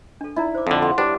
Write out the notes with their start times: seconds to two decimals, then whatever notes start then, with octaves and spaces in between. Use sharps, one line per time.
0.21 D4 A4
0.36 D#4 E4 D5 A#5
0.55 C5 D6
0.67 F2 D3 F5 D#6
0.82 F#5 C6
0.98 G3 D4 B4 C#5 D5 D6